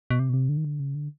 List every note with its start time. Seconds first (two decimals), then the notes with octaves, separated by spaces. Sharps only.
0.10 B2
0.19 C3
0.29 B2
0.33 C3
0.49 D3
0.57 D#3
0.65 D3
0.80 C#3
0.95 D3